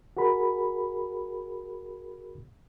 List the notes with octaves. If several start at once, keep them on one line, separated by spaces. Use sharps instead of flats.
F#4 G#4 A#4 B5